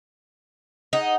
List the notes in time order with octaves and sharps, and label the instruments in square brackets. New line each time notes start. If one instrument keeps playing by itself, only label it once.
[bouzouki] D#4 [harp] G#4 F#5